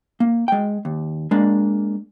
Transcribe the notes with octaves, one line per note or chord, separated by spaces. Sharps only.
A#3
G#3 G5
D#2
G#3 A#3 D4